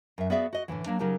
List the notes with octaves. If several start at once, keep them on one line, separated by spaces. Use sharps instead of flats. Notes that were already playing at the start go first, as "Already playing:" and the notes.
F#2 E5
B3 F#4 G#4 D5 E5 F5
F#4 D#5
A2 D3 E3 F#3
F#3 A#3 D4
C#3 F#3 D#4 G4 A#4 A5